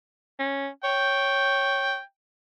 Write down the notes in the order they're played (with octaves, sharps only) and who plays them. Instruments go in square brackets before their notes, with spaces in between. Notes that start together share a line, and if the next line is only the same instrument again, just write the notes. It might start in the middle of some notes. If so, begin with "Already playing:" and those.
[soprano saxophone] C#4
[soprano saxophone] C#5 [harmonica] G5